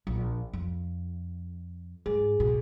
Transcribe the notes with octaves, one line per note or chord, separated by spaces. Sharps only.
A#1
F2
G#2 G#4
B2